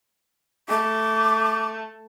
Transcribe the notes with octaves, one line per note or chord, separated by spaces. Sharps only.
A3 D6